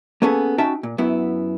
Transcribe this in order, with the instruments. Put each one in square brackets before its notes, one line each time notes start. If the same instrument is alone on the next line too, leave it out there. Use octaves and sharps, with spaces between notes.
[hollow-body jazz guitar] A#3 B3 C#4 G#4 A4 B4
C#4 D#4 F#4 E5 G5 A5
A#2
F#2 B3 E4